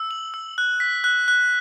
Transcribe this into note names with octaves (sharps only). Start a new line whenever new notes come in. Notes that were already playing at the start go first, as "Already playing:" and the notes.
Already playing: E6
F#7
E6
F#6
B6
F#6
F#6